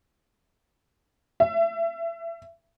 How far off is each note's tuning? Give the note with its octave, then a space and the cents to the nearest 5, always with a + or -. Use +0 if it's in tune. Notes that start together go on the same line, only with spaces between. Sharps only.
E5 +25